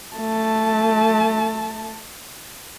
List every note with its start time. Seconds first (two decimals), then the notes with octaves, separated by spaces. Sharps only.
0.15 A3 A5